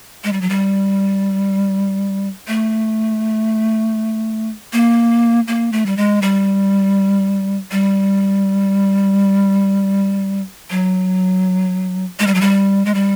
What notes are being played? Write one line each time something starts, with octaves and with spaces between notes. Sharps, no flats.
G#3
G3
F#3
G3
A3
A#3
A#3
A3
G3
G#3
G3
G3
F#3
G#3
G3
F#3
G3
G#3
G3